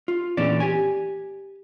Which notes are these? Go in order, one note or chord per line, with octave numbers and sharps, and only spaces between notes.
F4
E2 A#2 E3 C#4 D4 D5
G4 G#5